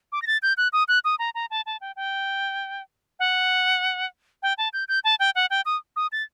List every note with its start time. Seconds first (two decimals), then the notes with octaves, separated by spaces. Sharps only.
0.12 D6
0.22 A#6
0.27 A6
0.42 G6
0.57 F#6
0.73 D#6
0.88 F#6
1.05 D#6
1.19 A#5
1.35 A#5
1.51 A5
1.66 A5
1.81 G5
1.96 G5
3.19 F#5
4.43 G5
4.58 A5
4.73 G6
4.88 G6
5.04 A5
5.20 G5
5.35 F#5
5.50 G5
5.66 D#6
5.96 D#6
6.12 A6